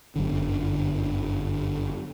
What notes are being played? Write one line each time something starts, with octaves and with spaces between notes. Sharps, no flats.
G1 F#2 D3